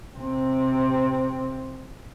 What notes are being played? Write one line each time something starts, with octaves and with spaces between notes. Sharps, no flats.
C3 C4